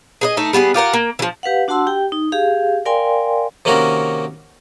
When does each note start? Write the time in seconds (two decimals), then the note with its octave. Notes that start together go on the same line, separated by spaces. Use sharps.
0.21 G#4 B4 D#5
0.37 A3 D#4
0.53 G3 B3 F#4 G#4
0.74 F4 G4 A#4 F#5
0.93 A#3
1.19 E3 F3
1.43 G4 B4 F5 F#5
1.68 D4 F#4 F#5 A5 C6 E6
1.87 G4 G5
2.12 D#4
2.32 G4 G#4 F5
2.85 A#4 D5 F5 G5 G#5 C6
3.65 C3 D#3 A#3 C#4 F#4 A#4